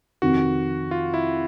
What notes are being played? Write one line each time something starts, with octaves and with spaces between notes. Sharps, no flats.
F2 C3 D#3 F#4
F4
E4